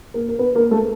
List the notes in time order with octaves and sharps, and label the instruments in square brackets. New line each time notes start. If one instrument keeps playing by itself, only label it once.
[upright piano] A#3 A#4
A#4
B3 B4
A#3 A#4
A3 A4